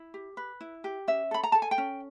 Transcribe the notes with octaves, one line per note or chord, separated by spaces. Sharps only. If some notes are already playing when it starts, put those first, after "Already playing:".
Already playing: E4
G4
B4
E4
G4
C#4 E5
A4 B5
A#5
A4 A5
G#5
G5
C#4